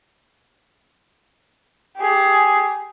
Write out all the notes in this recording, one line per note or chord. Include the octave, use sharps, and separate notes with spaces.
G4 G#4